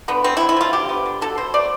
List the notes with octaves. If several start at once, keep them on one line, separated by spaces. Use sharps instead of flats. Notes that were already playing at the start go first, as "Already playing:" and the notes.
D3 B3
B3 C4
E4
D3
E4
F3 F4
D3 G4
B3
D3
B2 A4
B2 C5
A3 D5